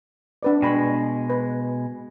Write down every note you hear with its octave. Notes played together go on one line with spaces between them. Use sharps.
D4 B4 D5
B2 G#3 G5 B5 C#6
B4